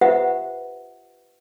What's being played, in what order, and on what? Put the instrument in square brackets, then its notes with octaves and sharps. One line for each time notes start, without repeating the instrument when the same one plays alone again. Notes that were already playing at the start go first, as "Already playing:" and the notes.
[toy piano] F4 G4 B4 C5 E5 F#5